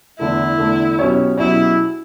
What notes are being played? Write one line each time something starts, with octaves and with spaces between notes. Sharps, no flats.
E2 D3 A3 E4
E2 D3 A3
B2 F#3 C#4 G4 C#5
B2 F#3 C#4 E4 G4 C#5